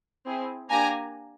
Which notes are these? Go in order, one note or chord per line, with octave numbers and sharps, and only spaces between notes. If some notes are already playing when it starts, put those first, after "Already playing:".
C4 E4 G#4
A#3 D4 G4 G#5 A#5